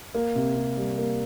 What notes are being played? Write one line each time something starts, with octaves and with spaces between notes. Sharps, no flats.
A#3
C3
C3
G3
A#3